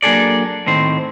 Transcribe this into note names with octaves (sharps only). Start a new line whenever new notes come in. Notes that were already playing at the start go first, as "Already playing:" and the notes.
F#3 A#3 D4 G#4 A4 D5
A2 D#3 C4 C5